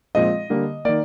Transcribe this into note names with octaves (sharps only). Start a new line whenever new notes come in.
A#2 F3 G#3 C4 D#5
D3 G3 A#3
D#3 A#3 D5